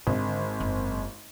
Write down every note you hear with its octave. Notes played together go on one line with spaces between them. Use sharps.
G#1 D3
F#1